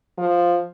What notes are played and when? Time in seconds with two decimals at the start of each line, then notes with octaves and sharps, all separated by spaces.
0.18 F3